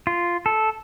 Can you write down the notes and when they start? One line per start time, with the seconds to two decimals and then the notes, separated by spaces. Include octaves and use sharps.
0.07 F4
0.46 A4